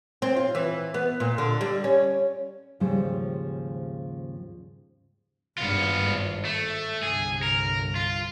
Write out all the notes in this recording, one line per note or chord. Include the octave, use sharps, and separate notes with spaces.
C4
F4
E3
B3
A#2
D3
G3
C#4
D#2 G#2 C#3 F3 G3 C5
G#1 G2 B3 F4
G#1
A3
G1 C2 G#4
A#4
F4